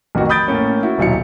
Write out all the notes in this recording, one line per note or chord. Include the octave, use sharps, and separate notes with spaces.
A1 F2 D#3 F#4
B5 D#6 G6 A6 D7
A2 A#3 C#4
E4 F#4
D#1 B1 F#3 E4 C#7